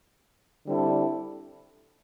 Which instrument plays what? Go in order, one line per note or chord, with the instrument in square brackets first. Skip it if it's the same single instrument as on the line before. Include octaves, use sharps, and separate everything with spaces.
[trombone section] D3 G3 C4 E4 A4